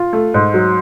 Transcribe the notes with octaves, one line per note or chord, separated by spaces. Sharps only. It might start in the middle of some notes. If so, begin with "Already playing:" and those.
Already playing: F4
A3
G#2
F#3